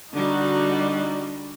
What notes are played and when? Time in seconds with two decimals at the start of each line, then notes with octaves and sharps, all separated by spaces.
0.13 D3 G3 D#4 F#4